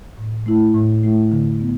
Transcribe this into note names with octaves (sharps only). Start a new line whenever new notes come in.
A2
A3 E4
A2
A3 E4
D3
B3